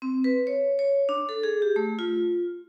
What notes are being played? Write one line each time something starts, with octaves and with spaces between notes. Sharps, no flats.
C4
B4
C#5
C#5
D4
A4
G#4
G4
A3
F4